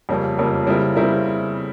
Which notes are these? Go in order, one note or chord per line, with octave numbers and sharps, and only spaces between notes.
F2 C#3 G3 A#3 C#4
F2 C#3 G3 A#3 C#4
C#3 G3 C4 E4 A#4
C#3 G3 C4 E4 A#4